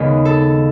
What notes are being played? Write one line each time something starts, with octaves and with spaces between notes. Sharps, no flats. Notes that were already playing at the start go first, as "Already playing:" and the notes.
Already playing: D#2 C#3 G#3 B3
A4